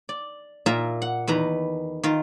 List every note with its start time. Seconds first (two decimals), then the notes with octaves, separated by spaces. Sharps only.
0.09 D5
0.66 A#2 F4 A#4 E5 A#5
1.02 F#5
1.27 E2 D#3 B4 A#5
2.03 D#3 F4